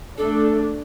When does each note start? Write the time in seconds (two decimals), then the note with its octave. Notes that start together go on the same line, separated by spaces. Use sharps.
0.18 A3 D4 A4